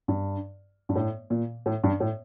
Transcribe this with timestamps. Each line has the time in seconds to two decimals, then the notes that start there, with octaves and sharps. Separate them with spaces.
0.08 G2
0.89 G2
0.96 A2
1.30 A#2
1.66 A2
1.83 G2
2.00 A2